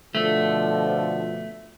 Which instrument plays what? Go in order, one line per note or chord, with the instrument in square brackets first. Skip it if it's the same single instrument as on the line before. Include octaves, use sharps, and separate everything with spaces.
[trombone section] B2 D3 F3 [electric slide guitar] A3